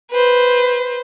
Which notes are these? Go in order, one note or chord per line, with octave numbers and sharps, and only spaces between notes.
B4 C5